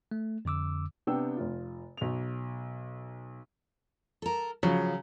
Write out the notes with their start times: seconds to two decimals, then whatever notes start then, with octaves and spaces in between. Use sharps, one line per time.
0.11 A3
0.45 F2 D3 D6 E6
1.07 C3 B3 D4 G5 E6
1.37 F1 F4
1.97 B1 F7
4.22 A4 A#4
4.63 C#3 F3 F#3